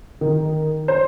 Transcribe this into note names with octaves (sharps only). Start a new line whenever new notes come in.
D#3
C5